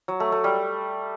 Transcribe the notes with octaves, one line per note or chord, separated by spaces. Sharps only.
F#3
A3
A3
G3